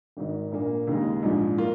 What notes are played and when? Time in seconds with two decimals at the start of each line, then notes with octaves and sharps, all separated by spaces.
0.17 G#1 G#2 D#3
0.52 A#1 A#2 A#3
0.87 D#2 C#3 G#3 D#4
1.23 A#1 G#2 F3
1.58 A#3 F4